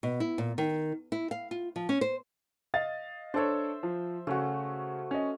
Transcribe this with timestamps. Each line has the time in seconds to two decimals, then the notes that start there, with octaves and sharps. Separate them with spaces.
0.03 B2
0.20 E4
0.38 A#2
0.58 D#3
1.12 E4
1.31 F5
1.51 F4
1.76 F3
1.89 C#4
2.01 C5
2.74 D#5 F5 A6
3.34 D4 A4 C5 C#5 E5
3.83 F3
4.27 C#3 A3 C#4 F#4
5.11 C#4 D#5